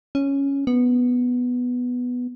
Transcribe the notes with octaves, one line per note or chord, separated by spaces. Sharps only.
C#4
B3